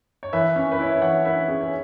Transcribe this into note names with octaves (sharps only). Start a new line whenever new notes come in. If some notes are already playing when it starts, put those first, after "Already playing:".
C#5
E3 B4 E5
C#4
B4
E4 C#5
E5
E3 C#5 F#5
E3 B4 E5
C#4 G#4 C#5
C#5